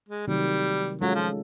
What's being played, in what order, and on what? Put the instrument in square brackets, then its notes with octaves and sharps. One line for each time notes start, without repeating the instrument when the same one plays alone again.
[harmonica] G#3
[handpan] C3 D#3 F#3 A3 [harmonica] G3
[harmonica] F#3 [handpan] G#3 C#4 F4 A4
[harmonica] F3